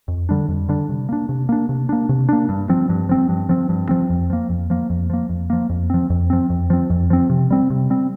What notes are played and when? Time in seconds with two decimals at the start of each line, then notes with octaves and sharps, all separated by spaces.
0.08 F2
0.29 D3 G3 D4
0.48 F2
0.69 D3 G3 D4
0.89 C3
1.09 A#3 D4
1.29 C3
1.49 A#3 D4
1.69 C3
1.89 A#3 D4
2.09 C3
2.29 A#3 D4
2.49 G2
2.69 F3 C4
2.89 G2
3.09 F3 C4
3.29 G2
3.49 F3 C4
3.69 G2
3.89 F3 C4
4.10 F2
4.30 F3 A#3
4.49 F2
4.70 F3 A#3
4.90 F2
5.10 F3 A#3
5.29 F2
5.50 F3 A#3
5.70 F2
5.90 F3 C4
6.10 F2
6.30 F3 C4
6.50 F2
6.70 F3 C4
6.90 F2
7.10 F3 C4
7.30 C3
7.51 G3 C4
7.70 C3
7.90 G3 C4